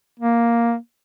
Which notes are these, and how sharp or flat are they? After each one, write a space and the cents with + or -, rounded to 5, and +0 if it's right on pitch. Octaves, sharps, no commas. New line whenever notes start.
A#3 +5